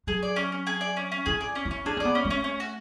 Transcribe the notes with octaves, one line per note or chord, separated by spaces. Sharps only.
F#3 G#4
D5
C#4
C#4
G#4
D5
C#4
C#4
E4 G#4
D5
C#4
E4
C#4
D4 G#4
C#4
B3 D5
C#4
A3
C#4
C#4
F#4